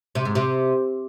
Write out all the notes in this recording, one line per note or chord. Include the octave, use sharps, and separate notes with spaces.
C3
G#2
C3